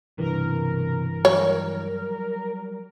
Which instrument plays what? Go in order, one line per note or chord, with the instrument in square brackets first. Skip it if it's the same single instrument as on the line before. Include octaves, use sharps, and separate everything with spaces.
[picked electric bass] B1 C3 [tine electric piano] G2 E3 [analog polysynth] A#4
[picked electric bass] F#3 G3 [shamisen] C#5